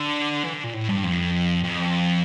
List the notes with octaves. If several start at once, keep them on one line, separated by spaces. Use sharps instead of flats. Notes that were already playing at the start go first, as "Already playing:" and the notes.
Already playing: D3
E3
D3
A#2
A2
G2
F2
F2